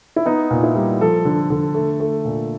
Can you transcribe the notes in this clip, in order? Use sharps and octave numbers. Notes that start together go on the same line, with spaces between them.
E4
B3 D#4
A#2
E4
G3
F3 A4
D3
D3
A3
A3
A#2